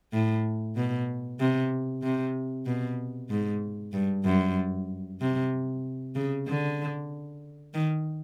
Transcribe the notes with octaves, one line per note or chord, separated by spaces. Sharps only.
A2
B2
C3
C3
B2
G#2
G2
F#2
C3
C#3
D3
D#3